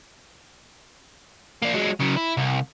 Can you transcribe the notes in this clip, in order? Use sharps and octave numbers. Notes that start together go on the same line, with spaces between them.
A#3 D4
F#3 G#3
C#3 F#3
E4
C2